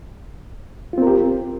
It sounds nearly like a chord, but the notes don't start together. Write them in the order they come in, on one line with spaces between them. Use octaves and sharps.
F4 C4 A#4 G4